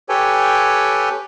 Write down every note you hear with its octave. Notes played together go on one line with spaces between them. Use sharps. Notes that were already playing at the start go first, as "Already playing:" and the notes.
G4 A4 B4 C#5 G5 G#5